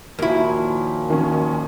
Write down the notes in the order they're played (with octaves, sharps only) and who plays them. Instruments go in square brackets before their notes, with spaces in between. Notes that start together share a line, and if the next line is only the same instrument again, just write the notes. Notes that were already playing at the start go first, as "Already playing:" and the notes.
[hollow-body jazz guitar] D#2 E4 [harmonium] A#2 F3 [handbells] F#4 A#4
[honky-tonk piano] D#3 C#4